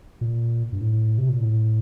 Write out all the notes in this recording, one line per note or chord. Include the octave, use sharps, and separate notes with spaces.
A#2
G2
A2
C3
A#2
A2